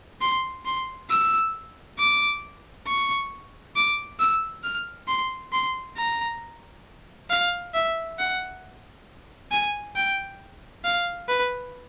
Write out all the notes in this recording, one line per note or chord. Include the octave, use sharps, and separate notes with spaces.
C6
C6
E6
D6
C#6
D6
E6
F6
C6
C6
A#5
F5
E5
F#5
G#5
G5
F5
B4